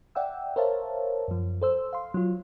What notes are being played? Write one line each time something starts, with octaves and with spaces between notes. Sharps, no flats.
D5 E5 F#5 G5 E6
A#4 C5 C#5 E5 F5 A5
F#2 F3
A4 C5 E6
F5 C6
F#3 F4